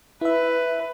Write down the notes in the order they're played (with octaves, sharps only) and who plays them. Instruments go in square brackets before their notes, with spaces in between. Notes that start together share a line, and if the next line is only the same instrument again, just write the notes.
[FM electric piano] E4 E5 [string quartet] B4